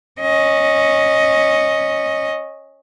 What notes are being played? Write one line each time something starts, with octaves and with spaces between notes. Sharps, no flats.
C#4 D#5